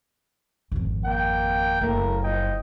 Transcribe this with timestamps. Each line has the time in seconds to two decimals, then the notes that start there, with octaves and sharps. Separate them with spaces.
0.72 G#1 F2
1.05 A#3 G5
1.81 F#1 A3 A#3 A#4
2.23 F3 D#5 G5